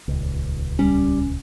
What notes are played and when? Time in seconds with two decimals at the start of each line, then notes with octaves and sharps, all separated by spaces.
0.08 D#1 C#2
0.79 G3 C#4